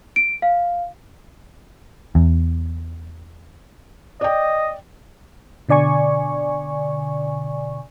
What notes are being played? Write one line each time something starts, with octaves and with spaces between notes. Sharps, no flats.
D7
F5
E2
D5 D#5 G5
B2 D3 D5 G#5 C#6